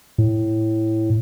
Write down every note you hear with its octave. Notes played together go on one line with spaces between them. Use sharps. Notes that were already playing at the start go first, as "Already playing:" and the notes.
A2